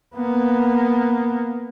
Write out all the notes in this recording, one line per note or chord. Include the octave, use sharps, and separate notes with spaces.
A#3 B3